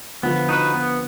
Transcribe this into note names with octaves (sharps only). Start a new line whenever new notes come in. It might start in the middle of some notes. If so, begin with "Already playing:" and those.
D3 F3 B3
D#4 F#4 B4
B3